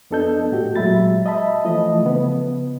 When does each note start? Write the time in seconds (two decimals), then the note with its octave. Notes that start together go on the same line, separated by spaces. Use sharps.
0.10 F2 B3 D4 A4 D#5 G6
0.52 A2 F#4 G4
0.76 A#2 F#3 G#3 E5 B5 A6
1.26 D#5 E5 A5 B5
1.65 E3 F3 A3 D#5
2.02 C#3 B3